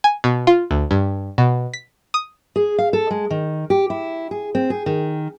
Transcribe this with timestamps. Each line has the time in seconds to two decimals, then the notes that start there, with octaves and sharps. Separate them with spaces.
0.04 G#5
0.24 B2
0.47 F4
0.71 D2
0.91 G2
1.38 B2
1.73 B6
2.14 D#6
2.56 G#4
2.78 F5
2.93 A4
3.10 G#3
3.30 D#3
3.70 G4
3.90 E4
4.31 G#4
4.55 C4
4.70 G#4
4.86 D#3